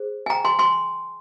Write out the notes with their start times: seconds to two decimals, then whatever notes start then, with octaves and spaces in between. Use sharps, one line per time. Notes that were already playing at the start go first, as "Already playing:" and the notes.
Already playing: G#4 C5
0.26 G#5
0.30 G5 A#5
0.45 G#5 C6
0.59 G#5 C6